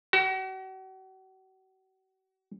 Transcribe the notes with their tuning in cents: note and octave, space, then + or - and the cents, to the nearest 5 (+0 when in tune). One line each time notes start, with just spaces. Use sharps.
F#4 +40